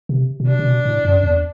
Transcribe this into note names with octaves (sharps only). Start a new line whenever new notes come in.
C3
B2
C3 D4
C3
B2
A2
F#2
E2